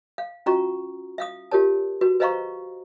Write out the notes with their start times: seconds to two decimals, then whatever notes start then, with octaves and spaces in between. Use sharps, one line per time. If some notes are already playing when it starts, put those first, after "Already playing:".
0.18 F5
0.46 C#4 F4 F#4 A#5 C#6
1.18 E5 F5 D#6
1.51 F4 G4 A#4 C#5 A5
2.01 F#4 B4
2.20 B4 C5 D#5 F5 A#5 C#6